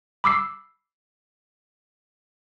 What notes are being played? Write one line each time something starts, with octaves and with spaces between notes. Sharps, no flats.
B5 D6 E6 C7